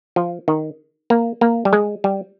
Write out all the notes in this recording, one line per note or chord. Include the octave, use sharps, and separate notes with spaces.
F3
D#3
A#3
A#3
G3
G#3
G3